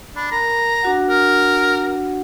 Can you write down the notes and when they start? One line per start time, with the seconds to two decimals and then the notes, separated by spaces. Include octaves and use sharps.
0.16 D4 B5
0.32 A#4 A#5
0.83 D4 F#4 F#5
1.10 A#4